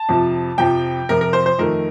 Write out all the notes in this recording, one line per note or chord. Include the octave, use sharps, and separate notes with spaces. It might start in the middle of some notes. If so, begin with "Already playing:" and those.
Already playing: A5
F2 C3 F3
F2 C3 F3 G5
F2 C3 F3 A#4
A#4
C5
C5
F2 D#3 A3 A#4